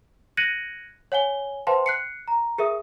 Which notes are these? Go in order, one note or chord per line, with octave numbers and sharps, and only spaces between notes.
F#6 G#6 A#6 C#7 D#7 F#7
C#5 F#5 G#5 G7
B4 C5 F5 G5 A5 C6
F#6 C7 C#7
A#5
G#4 A#4 E5 D#6